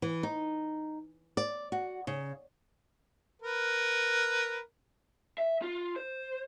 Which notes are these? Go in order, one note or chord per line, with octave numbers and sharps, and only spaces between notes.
E3
D#4
D5
F#4
C#3
A#4 B4
E5
F4
C5